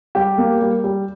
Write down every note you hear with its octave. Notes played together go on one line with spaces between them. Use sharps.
G3 G4
A#3
G3
G3